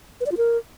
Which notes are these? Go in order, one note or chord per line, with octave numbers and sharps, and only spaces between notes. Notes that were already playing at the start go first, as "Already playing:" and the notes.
B4
D5
F4
A#4